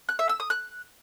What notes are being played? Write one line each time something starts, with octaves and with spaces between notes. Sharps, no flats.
F#6
E5
E6
D#6
F#6